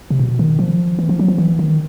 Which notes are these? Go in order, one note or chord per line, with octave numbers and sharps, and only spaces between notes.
C3
B2
D#3
F3
E3
F3
F#3
F3
E3
D#3